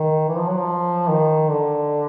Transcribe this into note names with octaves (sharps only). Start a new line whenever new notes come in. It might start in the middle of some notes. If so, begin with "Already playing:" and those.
Already playing: D#3
E3
F3
F#3
F3
D#3
D3